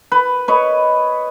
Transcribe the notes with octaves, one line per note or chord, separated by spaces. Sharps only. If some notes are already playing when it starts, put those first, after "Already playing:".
B4
B4 C#5 D#5